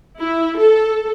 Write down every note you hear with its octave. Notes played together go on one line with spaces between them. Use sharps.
E4
A4